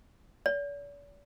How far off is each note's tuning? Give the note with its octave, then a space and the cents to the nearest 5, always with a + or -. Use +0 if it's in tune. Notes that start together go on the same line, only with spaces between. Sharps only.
D5 -45